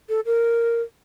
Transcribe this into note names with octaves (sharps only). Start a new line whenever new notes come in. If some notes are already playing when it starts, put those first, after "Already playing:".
A4
A#4